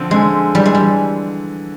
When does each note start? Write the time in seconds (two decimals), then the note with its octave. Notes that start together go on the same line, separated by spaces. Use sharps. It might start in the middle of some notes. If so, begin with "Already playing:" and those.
Already playing: D3 F3 C4
0.11 D3 G#3
0.55 E3 G3
0.66 G#3
0.75 G3